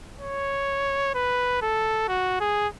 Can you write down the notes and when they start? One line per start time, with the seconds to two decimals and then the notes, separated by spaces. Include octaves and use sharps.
0.20 C#5
1.15 B4
1.62 A4
2.09 F#4
2.41 G#4